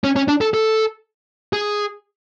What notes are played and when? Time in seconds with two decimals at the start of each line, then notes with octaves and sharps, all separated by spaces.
0.04 C#4
0.16 C#4
0.28 D4
0.41 A4
0.54 A4
1.53 G#4